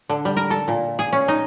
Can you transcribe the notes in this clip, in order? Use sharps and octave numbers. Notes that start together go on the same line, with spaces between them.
D3
G3
A#4
A4
A#2
G#4
C#4
D#4